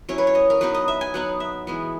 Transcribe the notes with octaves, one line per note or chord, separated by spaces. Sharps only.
F#3 C#4 E4 C#5
B4
C#5
D#5
A#4
F#3 B3 D#4 B4
D#5
E5
G#5
F#3 B3 D#4 F#5
E5
E3 G#3 B3 F#4